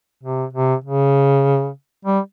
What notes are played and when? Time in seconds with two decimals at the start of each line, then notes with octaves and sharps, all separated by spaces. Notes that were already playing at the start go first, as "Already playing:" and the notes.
0.23 C3
0.53 C3
0.84 C#3
2.05 G3